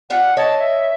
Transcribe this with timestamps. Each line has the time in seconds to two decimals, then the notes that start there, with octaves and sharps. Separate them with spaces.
0.10 D4 F4 G4 F#5
0.37 E4 C#5 D#5 A5
0.59 E5